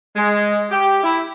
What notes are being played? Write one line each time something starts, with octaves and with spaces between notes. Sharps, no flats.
G#3
G4
E4